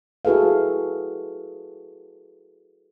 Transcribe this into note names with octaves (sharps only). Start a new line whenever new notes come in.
E4 F#4 G#4 A4 B4 F5